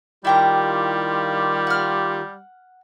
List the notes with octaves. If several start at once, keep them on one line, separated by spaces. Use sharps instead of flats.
D#3 G3 E4 F4 G4 G5 A#5
F#5 F6